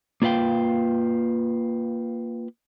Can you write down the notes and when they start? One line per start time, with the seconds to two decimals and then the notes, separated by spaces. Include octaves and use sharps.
0.22 A#3 F4 B4 F5 G5